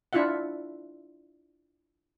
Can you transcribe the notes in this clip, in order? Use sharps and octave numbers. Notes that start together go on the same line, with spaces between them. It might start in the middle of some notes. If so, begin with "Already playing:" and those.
D4 E4 F4 E5 F#5